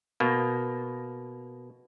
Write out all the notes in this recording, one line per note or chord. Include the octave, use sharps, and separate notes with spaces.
B2 A#3